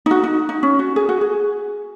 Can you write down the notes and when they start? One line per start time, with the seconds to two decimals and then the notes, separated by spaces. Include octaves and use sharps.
0.06 D#4
0.11 F#4
0.24 D#4
0.49 D#4
0.63 C#4
0.79 F#4
0.96 G#4
1.09 F#4
1.21 G#4